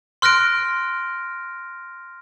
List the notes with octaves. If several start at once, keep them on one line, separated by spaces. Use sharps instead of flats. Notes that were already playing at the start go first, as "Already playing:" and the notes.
C6 F6 F#6 A#6 D7